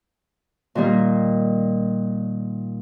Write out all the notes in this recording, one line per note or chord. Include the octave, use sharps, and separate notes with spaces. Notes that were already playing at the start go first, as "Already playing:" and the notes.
A#2 D#3 G3 A#3